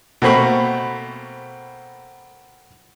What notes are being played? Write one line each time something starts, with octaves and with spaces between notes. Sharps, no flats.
B2 A3 A#3 C4 B5 C#6